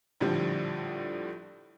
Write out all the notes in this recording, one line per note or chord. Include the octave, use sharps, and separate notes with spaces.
A#1 A2 D3 F3 G3